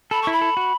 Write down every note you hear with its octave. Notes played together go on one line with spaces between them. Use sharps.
A4 B5
C#6
E4 B5
A4
F#4